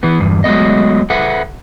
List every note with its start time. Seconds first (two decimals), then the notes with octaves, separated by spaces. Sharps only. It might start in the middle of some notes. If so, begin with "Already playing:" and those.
0.03 E3 B3
0.20 E2 G2
0.44 F#3 G#3 A3 B3 D#5
1.10 A4 B4 E5 F#5